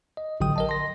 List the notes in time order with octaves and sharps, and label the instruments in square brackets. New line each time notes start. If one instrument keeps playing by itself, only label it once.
[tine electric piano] D#5
A1 D3 F#3 G5 D#6
A#4 D#5 A5
C6 A#6